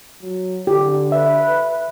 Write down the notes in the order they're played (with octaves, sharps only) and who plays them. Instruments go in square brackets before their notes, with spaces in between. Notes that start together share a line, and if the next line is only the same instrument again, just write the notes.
[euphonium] F#3
[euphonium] D3 [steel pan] G4
[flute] B4 [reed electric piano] E5